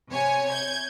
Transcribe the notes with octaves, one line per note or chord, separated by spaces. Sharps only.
C3 C#5 G#5
G6 G#6